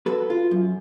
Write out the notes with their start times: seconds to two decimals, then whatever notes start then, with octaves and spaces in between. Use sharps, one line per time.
0.06 F#4 A4 B4
0.30 F4
0.51 F#2